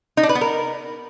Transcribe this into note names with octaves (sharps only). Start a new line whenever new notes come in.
D#4
D4
B4
B3
A#4